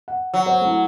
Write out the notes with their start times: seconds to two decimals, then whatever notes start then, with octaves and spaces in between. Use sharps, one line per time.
0.08 F#5
0.34 F#3
0.46 C5 C#5
0.61 A3 E4